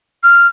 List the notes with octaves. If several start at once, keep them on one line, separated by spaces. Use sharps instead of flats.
F6